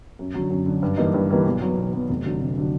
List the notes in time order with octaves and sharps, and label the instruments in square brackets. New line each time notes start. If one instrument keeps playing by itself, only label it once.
[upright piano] F#2
D3 F#3
F#2
D3 F#3
G2
E3 G3 A#3 D#4
G2
E3 G3 A#3 D#4
B1
B2 F#3 B3
B1
B2 F#3 B3
F1
F2 D3 F#3
F1
D3 F#3